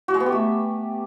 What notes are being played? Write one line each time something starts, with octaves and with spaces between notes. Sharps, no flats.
F#4
G#3
B3
G4
A3